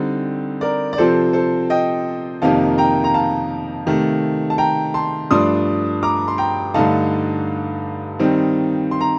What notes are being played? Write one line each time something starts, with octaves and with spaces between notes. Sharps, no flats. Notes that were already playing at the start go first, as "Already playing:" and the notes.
Already playing: D3 G3 C4 D#4
A#4 D5
D5
C3 F3 C4 A4 C5
A4 C5
D#5 G5
F2 C3 D#3 A#3 D#4 F5 A5
G5 A#5
A#5
F5 A5
C3 D#3 A3
A5
G5 A#5
A5 C6
G2 F3 A3 D4 C6 D#6
A#5 D6
C6
G5 A#5
G2 D3 A3 D#4 F5 A5
D#3 G3 C4 D#4
C6
A#5